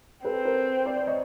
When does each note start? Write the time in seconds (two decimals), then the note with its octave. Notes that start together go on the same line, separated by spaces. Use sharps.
0.25 C4 A4 B4
0.45 A#4 C5
0.86 C5 D5
1.07 C#5 D#5